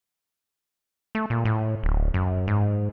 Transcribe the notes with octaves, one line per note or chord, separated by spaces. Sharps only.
A3
A#2
A2
D1
F#2
G#2